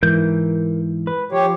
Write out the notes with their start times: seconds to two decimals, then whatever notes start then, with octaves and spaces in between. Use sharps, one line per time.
0.03 G#2 E3 A#4 G6
1.07 B4
1.32 F3 G4 C#5